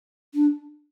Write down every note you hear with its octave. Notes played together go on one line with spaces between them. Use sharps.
D4